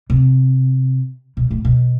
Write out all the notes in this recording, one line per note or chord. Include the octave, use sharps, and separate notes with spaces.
C3
B2
A2
B2